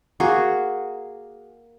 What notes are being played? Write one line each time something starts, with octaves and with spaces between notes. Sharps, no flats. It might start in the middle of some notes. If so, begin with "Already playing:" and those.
A#3 F#4 G#4